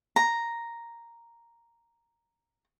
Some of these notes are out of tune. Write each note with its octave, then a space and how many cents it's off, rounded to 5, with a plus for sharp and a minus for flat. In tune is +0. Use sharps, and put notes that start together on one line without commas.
A#5 +0